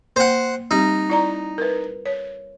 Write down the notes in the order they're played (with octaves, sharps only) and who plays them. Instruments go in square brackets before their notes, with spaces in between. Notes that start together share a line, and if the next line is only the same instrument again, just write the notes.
[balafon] A#3 G5 [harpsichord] C5 F#5
[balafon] G3 C4 G4 [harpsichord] D#4
[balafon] E4 D5 A#5
A#4 B4
C#5